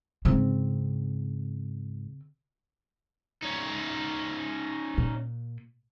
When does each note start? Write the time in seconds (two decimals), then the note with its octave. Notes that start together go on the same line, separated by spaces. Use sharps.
0.25 G#2 C#3 C4
3.43 C#4 D#4
4.98 A#2